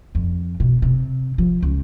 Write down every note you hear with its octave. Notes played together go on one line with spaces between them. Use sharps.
F2
B2
C3
F3
C#2